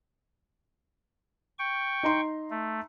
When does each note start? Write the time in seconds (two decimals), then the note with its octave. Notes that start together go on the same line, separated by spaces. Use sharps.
1.59 G5 C#6
2.03 D#4 A#5 C6
2.50 A3